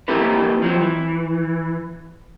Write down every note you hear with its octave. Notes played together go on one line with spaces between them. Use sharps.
A#3 C4 E4 G4 A4 B4
F3 F#3 C4
E3